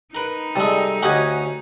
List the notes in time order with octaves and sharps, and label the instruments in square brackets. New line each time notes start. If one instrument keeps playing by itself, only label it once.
[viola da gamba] D#4 [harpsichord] A#4 B4
[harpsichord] C3 G#3 [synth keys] G3 A4
[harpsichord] D2 C#4 F#5 [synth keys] G4 D#5 G#5